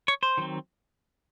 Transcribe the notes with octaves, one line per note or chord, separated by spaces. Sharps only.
C#5
C5
D#3 F#3 C4